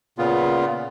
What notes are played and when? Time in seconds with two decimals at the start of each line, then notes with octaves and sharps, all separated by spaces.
0.18 A#2 C#3 B3 F4